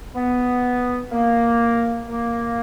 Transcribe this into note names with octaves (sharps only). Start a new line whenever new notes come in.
B3
A#3
A#3